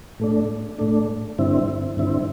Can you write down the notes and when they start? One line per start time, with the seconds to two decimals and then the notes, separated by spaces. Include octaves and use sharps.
0.20 A2 A3 D4
0.78 A2 A3 D4
1.38 G2 D3 C4 E4
1.97 G2 D3 C4 E4